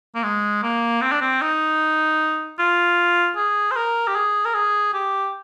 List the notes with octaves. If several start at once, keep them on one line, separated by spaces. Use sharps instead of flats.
A#3
G#3
A#3
C4
D4
C4
D#4
F4
G#4
C5
A#4
G4
G#4
A#4
G#4
G4